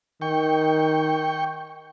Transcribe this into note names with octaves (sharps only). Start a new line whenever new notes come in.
D#3 G5 C#6